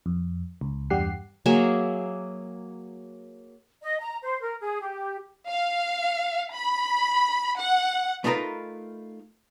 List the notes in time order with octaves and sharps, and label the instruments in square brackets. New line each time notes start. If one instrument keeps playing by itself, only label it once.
[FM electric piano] F2
C#2
E2 G2 G3 G4 F#5 C7
[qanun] F#3 A#3 G#4 E5
[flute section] D#5
A#5
C5
A#4
G#4
G4
[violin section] F5
B5
F#5
[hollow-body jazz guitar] A3 B3 D#4 F4 A#4 B4